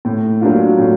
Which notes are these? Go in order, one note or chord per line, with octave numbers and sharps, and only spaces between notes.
A2
F#3 A#3 D4 F4
A2